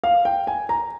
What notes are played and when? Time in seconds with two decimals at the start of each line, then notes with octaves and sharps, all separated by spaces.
0.04 F5
0.25 G5
0.47 G#5
0.69 A#5